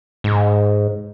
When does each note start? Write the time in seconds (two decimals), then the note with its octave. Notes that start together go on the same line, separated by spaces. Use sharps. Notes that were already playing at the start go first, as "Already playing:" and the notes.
0.24 G#2